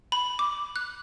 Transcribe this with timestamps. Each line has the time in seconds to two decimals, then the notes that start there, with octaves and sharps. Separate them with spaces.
0.12 B5
0.39 D6
0.76 F#6